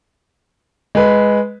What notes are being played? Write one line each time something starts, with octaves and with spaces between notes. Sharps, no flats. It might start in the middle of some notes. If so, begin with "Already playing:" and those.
G#3 B4